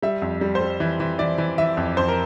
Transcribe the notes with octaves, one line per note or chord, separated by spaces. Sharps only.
G3 E5
F2
G3
C5
G3
E3
E3
E3 D5
E3
E3 E5
F2
F2 C5
A#4